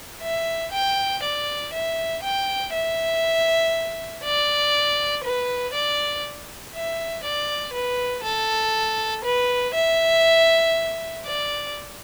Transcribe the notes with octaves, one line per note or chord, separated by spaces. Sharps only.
E5
G5
D5
E5
G5
E5
D5
B4
D5
E5
D5
B4
A4
B4
E5
D5